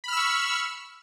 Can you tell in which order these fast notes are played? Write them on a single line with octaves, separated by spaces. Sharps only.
B5 F6 E6 C#6